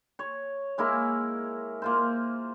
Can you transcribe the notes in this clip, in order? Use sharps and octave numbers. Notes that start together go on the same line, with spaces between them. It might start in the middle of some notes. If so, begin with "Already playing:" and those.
C#5
G#3 A#3 E4 A#4
A#3 F4 C5